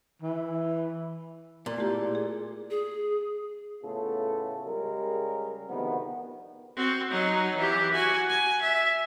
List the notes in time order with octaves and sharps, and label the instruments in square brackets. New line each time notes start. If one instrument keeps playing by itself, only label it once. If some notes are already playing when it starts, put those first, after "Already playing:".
[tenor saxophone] E3
[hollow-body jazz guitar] A#2 [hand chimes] B3 A#4 D5
[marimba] A3 G4 [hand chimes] E4 F4
[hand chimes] G#4 D5
[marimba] G#4
[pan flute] G#4
[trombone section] A2 C#3 A3 B3 F4 A4
C#3 G3 G#3 A#4
D2 C3 D#3 F3 B3
[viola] C4 F#4
F#3 D#4
E3 G4
F#4 G#5
G#5
E5